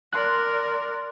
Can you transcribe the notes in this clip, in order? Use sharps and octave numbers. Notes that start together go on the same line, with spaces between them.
A#4 D5 C6 F#6